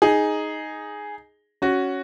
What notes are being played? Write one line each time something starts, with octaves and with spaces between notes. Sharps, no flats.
D#4 G#4
C#4 F#4